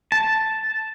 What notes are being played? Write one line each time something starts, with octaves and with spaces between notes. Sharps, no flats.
A5